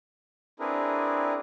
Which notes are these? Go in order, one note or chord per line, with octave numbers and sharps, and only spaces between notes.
C4 D4 E4 G#4 A#4 B4